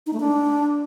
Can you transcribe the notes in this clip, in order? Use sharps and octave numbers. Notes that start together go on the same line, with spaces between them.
D#4
A3
D4